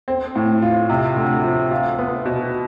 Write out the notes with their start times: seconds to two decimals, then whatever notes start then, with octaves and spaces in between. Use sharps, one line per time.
0.08 C4
0.36 A2
0.62 F4
0.90 C3
1.16 D2
1.44 F3
1.71 F4
1.98 B3
2.26 B2